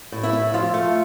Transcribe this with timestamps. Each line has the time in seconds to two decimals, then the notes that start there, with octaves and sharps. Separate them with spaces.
0.12 A2
0.23 E4 E5
0.33 A2
0.54 F3 F4 F5
0.74 A3